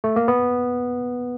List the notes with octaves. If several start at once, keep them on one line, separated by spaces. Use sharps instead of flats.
A3
A#3
B3